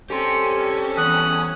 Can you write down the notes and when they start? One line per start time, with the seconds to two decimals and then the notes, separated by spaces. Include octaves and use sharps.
0.10 G3 C4 C#4 G4 A4 C6
0.98 E2 D#6 F#6